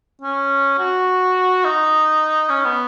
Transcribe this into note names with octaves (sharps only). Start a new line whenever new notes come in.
C#4
F#4
D#4
C#4
B3